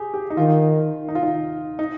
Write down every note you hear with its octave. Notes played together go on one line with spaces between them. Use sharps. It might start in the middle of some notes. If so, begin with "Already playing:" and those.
Already playing: G4 G#4
G4
D#4
D#3 F4
D#4
F4
D#4
D#4